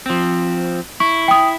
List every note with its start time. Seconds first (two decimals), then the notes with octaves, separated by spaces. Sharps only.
0.06 F3 C4
1.00 E4 C#6
1.28 G5 D#6